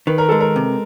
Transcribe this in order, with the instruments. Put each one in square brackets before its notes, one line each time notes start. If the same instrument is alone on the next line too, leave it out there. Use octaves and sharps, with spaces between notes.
[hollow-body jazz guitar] D#3 [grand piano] B4
[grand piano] A#4
[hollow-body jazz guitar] G#3 [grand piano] A4
[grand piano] A#4
[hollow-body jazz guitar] C3